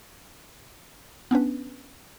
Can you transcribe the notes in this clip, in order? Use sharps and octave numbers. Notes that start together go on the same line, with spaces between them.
B3 C#4 D4 B4